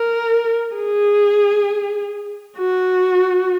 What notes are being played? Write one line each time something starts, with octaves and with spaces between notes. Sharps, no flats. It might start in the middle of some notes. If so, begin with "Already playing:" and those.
Already playing: A#4
G#4
F#4